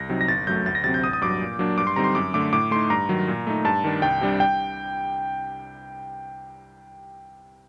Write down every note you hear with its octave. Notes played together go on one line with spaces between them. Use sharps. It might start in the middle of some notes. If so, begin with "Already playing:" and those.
Already playing: C2 A#6
C3 F#3 C4 D#4
A#6
G1 A6
F#2 F#3 A3 G6
D2 A6
A#6
C3 F#3 C4 A6
G6
A1 D#6
D#6
G2 F#3 D6
A#2
F#3 A#3 D4
G2 D6
C6
D3 G3 C4 D#4 A#5
C6
F#2 D6
D3 A3 D6
A2 D6
A3 D#4 C6
G2 A#5
D#3 F#3
A#2
A3 D#4
G2 A5
D#3 G3 D4
C2 G5
C3 G3 D4
G5